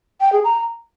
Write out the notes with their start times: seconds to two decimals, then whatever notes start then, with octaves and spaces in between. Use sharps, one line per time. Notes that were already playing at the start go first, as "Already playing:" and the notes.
0.21 G5
0.33 G#4
0.44 A#5